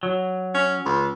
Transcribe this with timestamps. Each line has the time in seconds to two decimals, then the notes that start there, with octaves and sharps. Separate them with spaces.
0.03 F#3
0.54 C#4
0.85 C#2